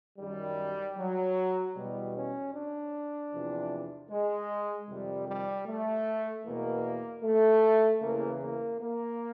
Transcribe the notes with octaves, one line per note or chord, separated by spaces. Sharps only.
F#2 D#3 G3
F#3
E2 B2 G3
C#4
D4
E2 C3 F3
G#3
F2 C3 D#3 G3
G3
A3
E2 B2 A#3
A3
E2 C#3 E3 A#3
A#3
A#3